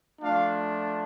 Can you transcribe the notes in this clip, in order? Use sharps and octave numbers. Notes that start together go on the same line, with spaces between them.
F3 A3 D4 F4 F5